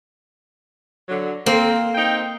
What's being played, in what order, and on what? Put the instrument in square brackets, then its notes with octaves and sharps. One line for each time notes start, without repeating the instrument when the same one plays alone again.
[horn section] D3 F#3
[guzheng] A#3 [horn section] C4
[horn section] C4 D#4 G5